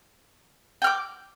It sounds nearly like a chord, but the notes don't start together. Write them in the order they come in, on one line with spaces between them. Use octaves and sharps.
G5 F6 D6